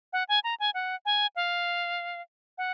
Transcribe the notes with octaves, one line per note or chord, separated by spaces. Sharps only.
F#5
G#5
A#5
G#5
F#5
G#5
F5
F#5